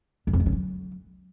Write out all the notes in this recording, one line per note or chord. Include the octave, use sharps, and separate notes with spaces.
E2
F2
G#3
C#3
F#3